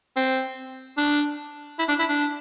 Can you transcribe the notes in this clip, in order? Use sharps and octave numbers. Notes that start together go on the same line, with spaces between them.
C4
D4
E4
D4
E4
D4